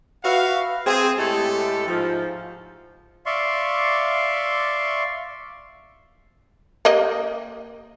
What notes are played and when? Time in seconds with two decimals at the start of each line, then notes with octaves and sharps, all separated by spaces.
0.23 F#4 B4 E5 F5
0.86 C4 G#4
1.17 A2 G#3 A3 G4 A4
1.87 G#2 F3
3.26 D5 E5 F5 C6 C#6
6.85 A#3 G4 D#5